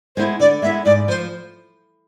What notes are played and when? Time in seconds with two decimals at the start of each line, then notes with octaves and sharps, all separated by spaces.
0.16 G#3 B3 E4 C5
0.40 D3 D5
0.62 G#3 B3 E4 E5
0.85 G#2 D5
1.08 F3 C5